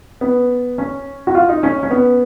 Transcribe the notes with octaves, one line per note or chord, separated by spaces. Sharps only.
B3
C#4
F#4
F4
D#4
C#4
C#4
B3